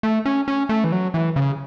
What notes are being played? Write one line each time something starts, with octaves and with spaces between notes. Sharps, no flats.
A3
C#4
C#4
A3
E3
F#3
E3
C#3